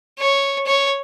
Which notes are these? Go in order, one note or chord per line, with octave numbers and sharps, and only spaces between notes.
C#5
C#5